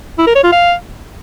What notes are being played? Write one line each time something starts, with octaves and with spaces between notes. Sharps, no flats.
E4
A#4
C#5
F4
F5